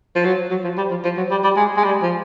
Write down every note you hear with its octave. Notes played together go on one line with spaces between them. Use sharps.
F3
F#3
F#3
F3
G3
F3
F3
F#3
G3
G3
G#3
G#3
G3
F3